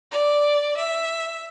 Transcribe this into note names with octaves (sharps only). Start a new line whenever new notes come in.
D5
E5